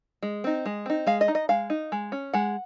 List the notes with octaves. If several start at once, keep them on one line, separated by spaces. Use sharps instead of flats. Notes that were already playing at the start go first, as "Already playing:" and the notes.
G#3
C4 D#4
G#3
C4 D#4
G#3 F5
D#5
D#4
D#5
G#3 F5
D#4
G#3
C#4
G#3 F#5